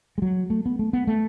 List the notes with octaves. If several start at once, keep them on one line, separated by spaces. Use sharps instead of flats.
G#3
F#3
A3
B3
A3
B3
A3